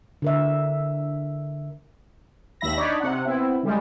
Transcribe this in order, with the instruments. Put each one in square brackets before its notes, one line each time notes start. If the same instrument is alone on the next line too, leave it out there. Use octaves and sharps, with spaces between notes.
[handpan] D3 A#4 E5
[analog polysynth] D#2 D#3 E5 B5 A#6
D4 D#4 C#5 D5 B5
C3 F#5
B3 C4 E4
C#3 G3 G#3